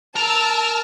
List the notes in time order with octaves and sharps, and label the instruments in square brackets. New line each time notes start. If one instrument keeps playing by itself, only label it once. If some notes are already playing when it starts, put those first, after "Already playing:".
[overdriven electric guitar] A#4 A#5 [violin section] A5 E6